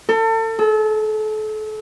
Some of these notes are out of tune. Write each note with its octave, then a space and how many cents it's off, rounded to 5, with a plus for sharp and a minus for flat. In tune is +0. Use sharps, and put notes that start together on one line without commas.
A4 +35
A4 -35